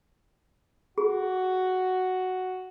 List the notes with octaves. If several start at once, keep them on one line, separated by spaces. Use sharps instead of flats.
F#4 G#4